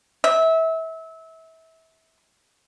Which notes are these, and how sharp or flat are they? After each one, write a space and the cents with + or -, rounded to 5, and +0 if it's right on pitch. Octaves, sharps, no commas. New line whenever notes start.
E5 -25